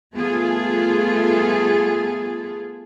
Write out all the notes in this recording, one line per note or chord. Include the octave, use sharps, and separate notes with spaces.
G3 A3 B3 F4 G#4 A4